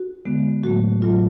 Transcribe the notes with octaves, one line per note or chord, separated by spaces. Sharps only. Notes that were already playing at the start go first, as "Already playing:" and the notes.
Already playing: F#4
D3 G#3 B3
A2 F#3 A3 F#4
A2 F#3 A3 F4